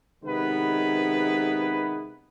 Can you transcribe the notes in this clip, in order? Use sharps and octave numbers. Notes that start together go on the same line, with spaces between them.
C3 D#3 G#3 B3 E4 B4